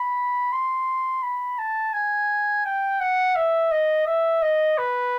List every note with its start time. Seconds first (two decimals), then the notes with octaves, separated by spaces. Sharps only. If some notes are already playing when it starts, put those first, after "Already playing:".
Already playing: B5
0.53 C6
1.23 B5
1.59 A5
1.93 G#5
2.66 G5
3.00 F#5
3.36 E5
3.72 D#5
4.07 E5
4.42 D#5
4.78 B4